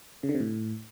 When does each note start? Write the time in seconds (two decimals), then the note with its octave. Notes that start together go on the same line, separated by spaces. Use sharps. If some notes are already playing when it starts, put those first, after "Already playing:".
0.23 C#3
0.29 D3
0.35 C3
0.40 A2